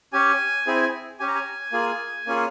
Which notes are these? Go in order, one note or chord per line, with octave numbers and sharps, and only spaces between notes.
C#4 G4 G#5
C4 E4 G#4
C#4 G4 G#5
A#5
G#5
A#3 F4 G#4
A#3 C#4 F4 G#4